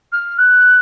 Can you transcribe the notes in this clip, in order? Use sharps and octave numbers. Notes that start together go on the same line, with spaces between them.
F6
F#6